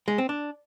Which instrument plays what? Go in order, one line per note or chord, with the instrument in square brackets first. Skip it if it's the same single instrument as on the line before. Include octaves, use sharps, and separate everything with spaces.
[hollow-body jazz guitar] G#3
C4
D4